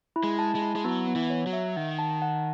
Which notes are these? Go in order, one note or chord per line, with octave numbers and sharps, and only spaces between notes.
E4
G#3
A5
G#3
E4
G#3
F#3 B3
B3
E3
C#5
F#3
E5
D#3 F#5
A5
F#5